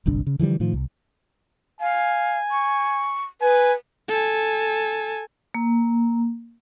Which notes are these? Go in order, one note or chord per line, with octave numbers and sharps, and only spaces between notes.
D1 G1 C2 D4
C#3
D3 E3 F3 G3
A2 D#3 F3
C2
F5 G#5
C#6
B4 G#5
A4 G#5
A#3